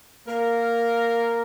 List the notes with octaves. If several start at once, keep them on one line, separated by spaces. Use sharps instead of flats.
A#3 A#4